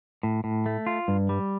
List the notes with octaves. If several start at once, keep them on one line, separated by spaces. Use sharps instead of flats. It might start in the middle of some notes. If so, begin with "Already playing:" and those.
A2
A2
A3
F4
G2
G3